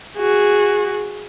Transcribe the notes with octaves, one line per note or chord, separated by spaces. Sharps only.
F#4 G#4